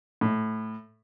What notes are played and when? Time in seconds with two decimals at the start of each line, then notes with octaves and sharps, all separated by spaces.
0.21 A2